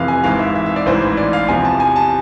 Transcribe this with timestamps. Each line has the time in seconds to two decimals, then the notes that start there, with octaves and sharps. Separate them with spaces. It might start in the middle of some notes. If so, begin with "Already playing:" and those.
Already playing: F1 F2 C3 E3 A4 B4 F5
0.08 G#5
0.23 G#1 G#2 E3 F5
0.39 E5
0.55 E5
0.66 E5
0.76 D5
0.86 A1 G#2 E3 C5
1.17 D5
1.33 F5
1.48 E2 C3 F3 G#5
1.65 A5
1.80 G#5
1.96 A5